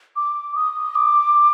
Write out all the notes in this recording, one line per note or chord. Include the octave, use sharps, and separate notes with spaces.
D6
D#6
D6